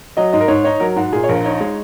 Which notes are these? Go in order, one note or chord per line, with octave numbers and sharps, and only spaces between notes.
F#3 D#5
G#2 D#5
A#4
G#2 C#5
D#4 C#5
F#3 A#4
G#2 F#4
A#2 G#4
C#5
A#1 A#4
D#4 C#5
G#3